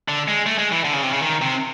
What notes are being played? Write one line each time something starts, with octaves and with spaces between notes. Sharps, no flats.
D3
G#3
A3
G#3
E3
D3
C#3
C3
C#3
D#3
C3